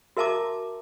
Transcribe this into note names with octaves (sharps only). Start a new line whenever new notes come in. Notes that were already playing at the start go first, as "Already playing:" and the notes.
F#4 A#4 E5 A5 A#5 D6